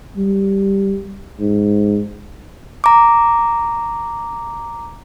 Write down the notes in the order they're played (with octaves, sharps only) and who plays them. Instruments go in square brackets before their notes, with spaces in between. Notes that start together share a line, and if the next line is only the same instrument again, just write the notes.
[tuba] G3
G#2
[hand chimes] A#5 D6